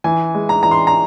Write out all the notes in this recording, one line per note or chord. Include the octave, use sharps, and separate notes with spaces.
E3 G#5
G#3
A#5
E3 A#5
C6
A#5